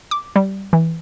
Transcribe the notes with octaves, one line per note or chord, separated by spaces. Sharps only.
D6
G3
E3